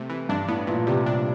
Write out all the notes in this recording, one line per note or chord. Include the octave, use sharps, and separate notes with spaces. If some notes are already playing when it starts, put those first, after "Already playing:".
Already playing: C3 A3
E3
G2 D4
A2 B3
A#2 E3
C3 G3
D4